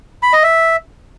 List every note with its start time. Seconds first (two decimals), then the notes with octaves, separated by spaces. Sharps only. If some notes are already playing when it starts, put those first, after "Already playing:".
0.23 B5
0.33 D#5
0.43 E5